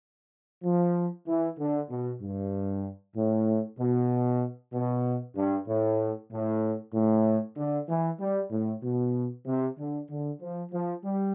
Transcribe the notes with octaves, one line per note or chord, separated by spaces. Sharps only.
F3
E3
D3
B2
G2
A2
B2
B2
G2
A2
A2
A2
D3
E3
G3
A2
B2
C3
D3
D3
F3
F3
G3